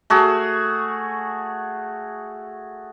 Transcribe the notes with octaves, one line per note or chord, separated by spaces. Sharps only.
A3 F#4 G#4